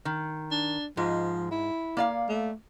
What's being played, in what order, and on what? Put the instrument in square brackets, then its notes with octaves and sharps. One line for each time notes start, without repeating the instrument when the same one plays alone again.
[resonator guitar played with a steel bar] D#3
[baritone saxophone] D4
[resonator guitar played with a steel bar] G#2 G#3 [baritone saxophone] F3
[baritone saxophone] E4
[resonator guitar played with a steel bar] A#3 D5 F5
[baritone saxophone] A3